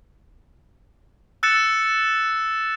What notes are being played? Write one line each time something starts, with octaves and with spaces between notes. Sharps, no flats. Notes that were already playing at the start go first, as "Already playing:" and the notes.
E6 F#6 A6 C#7 E7